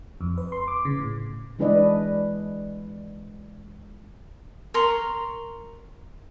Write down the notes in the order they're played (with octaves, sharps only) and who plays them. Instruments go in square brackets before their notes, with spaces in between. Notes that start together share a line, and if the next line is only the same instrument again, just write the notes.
[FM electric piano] F2
B4
C6
D6
C#3
A2
[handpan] E3 G#3 D4 B4 D5 D#5
[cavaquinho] A#4 A#5 C6 C#6